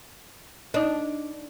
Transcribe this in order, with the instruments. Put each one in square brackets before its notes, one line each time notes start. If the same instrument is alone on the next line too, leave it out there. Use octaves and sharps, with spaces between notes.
[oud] D4 [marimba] D#4 D#5